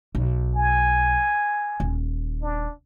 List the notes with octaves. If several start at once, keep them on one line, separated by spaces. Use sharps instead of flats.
B1
G#5
D#1
D4